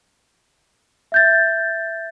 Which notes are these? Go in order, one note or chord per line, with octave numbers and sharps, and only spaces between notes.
E5 G6 A6